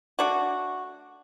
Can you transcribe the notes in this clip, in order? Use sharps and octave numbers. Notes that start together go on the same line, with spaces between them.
A3 D4 F#4